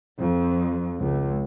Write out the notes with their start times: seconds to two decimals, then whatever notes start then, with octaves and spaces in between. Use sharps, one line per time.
0.20 F2
1.00 C#2